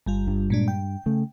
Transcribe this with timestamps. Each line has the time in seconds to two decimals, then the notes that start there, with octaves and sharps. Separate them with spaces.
0.06 G1 G3 F4
0.27 G2
0.50 A#2 G#3 D4
0.68 G5
1.06 C#3 A3